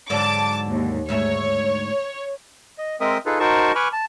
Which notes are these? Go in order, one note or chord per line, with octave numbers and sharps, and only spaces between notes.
G#2 D3 F#3 A5 D6
D#2
D2 G#2 C#5 E5
D#5
G#3 C4 A#4 D#5 E5 D#6
D#4 F4 G#4 A4 B4
D#4 F#4 A#4 C5 A5 C#6
B4 G#5 B5 C#6 D6 F6
A5